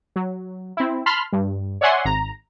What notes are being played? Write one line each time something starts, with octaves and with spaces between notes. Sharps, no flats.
F#3
C4 E4
A5 B5 C6 F6
G2
C#5 D5 E5 F#5 G#5 C6
G#1 A#5